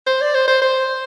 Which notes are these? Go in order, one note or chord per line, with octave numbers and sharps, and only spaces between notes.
C5
D5
C5
C5
C5